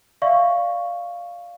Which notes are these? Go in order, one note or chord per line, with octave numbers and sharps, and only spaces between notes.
D5 E5 F5 C#6